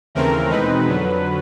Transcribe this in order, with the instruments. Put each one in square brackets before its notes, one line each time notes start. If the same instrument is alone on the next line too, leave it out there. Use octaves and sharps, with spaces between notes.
[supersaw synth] D#2 C#3 E3 A3 C4 A#4
E2 B2 G#3 C4 D#4 B4
F2 D3 F#3